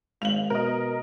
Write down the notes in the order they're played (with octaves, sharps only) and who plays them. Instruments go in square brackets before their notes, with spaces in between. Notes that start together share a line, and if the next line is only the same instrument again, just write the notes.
[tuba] G#1 [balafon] G#3 F5 [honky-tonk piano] F7 F#7
[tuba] B2 [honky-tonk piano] A#4 D#5